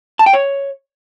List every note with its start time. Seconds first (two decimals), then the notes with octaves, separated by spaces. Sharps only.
0.19 A5
0.26 G5
0.33 C#5